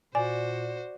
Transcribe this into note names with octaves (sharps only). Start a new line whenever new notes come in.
A#2 F#4 C5 D5 G#5